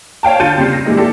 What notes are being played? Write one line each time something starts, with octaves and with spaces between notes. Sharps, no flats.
C#5 F5 G5 A5
D3 F4 G6 A6 C#7 D#7
C#3 G3 C4 C7
A#6
A#2 E3 G3 G#3 A#3 D#4
D4 E4 G4 A4